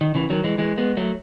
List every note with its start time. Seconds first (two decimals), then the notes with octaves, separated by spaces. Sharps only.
0.01 D#3
0.15 C#3 E3
0.30 D#3 F#3
0.44 E3 G#3
0.58 E3 G#3
0.78 G#3 B3
0.97 F#3 A3